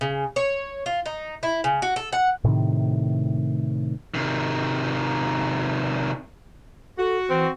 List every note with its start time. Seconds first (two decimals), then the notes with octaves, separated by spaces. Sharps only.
0.01 C#3
0.36 C#5
0.86 F4
1.06 D#4
1.43 E4
1.64 C#3
1.82 F#4
1.96 A4
2.12 F#5
2.44 A2 C3 D#3
4.14 C3 D#3
6.98 F#4 A4
7.30 E3 C4